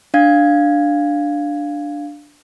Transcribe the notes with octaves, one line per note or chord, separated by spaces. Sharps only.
D4 F5 G#6